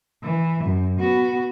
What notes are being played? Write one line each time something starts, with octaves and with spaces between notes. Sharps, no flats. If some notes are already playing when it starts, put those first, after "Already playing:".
E3
F#2
B3 F#4